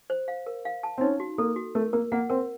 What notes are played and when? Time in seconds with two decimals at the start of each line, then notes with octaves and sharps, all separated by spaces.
0.10 C5
0.28 F5
0.47 A#4
0.65 F5
0.83 A5
0.98 C4
1.01 C#4 D#4
1.20 F#4
1.38 A#3 A4
1.56 F#4
1.75 A3 A#4
1.93 A#3 A#4
2.12 A#3 F#5
2.30 C4 A#4